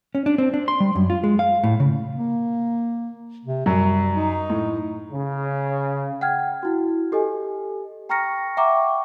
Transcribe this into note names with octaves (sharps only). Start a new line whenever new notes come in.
C#4
D4
C4
D4
C6
G3
F#2
F4
G#3
F5
A2
C#3
A#3
C3
F#2 F#3 G3
D#4
A2
C#3
F#5 G5 F6 G#6
E4 F#4
G4 A4 D#5 G#5
G5 A#5 C#6 F6 A#6 C#7
E5 F#5 G5 A#5 C#6 D6